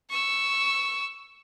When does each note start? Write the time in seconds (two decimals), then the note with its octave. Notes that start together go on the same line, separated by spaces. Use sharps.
0.10 C#6 E6